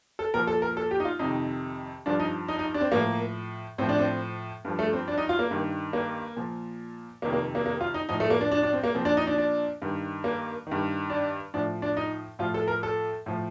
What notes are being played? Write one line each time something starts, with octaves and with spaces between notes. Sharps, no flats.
A4
A#2 F3 A#4
A4
A#4
A4
G4
D#4
F4
F2 C3 D#3 D#4
G2 F3 D4
D#4
D#4
D#4
D4
C4
A2 F3 A#3
A2 F3 C4
D4
C4
G2 F3
A3
C4
D4
D#4
F4
A#3
G2 D#3
A#3
A#2 F3
F2 C3 D#3 A#3
A#3
A#3
A#3
F4
D#4
A2 F3 D#4
A3
A#3
D4
D4
D4
C4
A#3
A#2 F3 C4
D4
D#4
D4
D4
G2 D#3
A#3
G2 D#3
D4
A2 F3 D4
D4
D#4
A2 F3 F4
A4
A#4
A4
A2 F3